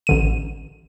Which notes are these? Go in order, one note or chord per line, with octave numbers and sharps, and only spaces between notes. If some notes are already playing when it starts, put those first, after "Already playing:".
A1 D3 D#7